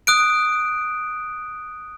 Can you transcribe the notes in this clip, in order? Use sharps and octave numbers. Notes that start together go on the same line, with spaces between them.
D#6 F#6 D7